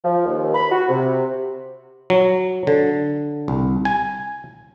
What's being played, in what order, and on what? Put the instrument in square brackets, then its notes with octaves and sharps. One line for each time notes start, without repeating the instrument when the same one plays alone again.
[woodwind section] F3
D#2
B5
F#4
C3
[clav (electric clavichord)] F#3
D3
C2
G#5